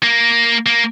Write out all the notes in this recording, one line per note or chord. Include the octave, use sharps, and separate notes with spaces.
A#3
A#3